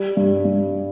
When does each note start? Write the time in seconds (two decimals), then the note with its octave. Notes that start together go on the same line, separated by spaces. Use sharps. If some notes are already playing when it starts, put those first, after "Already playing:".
Already playing: G3
0.17 G2
0.45 G2